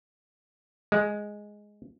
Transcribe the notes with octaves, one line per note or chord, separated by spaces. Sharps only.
G#3